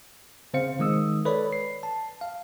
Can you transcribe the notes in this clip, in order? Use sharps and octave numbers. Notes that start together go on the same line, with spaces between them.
C#3 C4 C5 F5 C#7
D#3 G#3 D#6 E6
A4 B4 C#5 D5 B5
C7
A5
F5